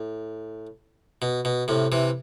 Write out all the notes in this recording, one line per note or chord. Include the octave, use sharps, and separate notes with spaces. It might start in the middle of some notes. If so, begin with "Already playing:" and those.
Already playing: A2
B2
B2
A2 C3
C3 E3